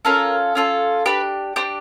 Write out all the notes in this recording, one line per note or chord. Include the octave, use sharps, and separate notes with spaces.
C#4 F4 A4 A#4
C#4 F4 A4
D4 G4 B4
D4 G4 C5